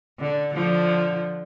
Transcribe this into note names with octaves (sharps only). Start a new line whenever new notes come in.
D3
D3 F3